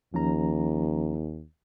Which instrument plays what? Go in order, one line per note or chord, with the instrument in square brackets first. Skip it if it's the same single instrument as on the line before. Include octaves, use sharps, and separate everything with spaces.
[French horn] D#2 [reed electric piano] F3 C#4 A#5